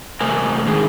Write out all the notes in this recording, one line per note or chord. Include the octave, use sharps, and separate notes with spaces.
C3 A3 A#4 C5 G#5
G#2 D3 D#3 G#4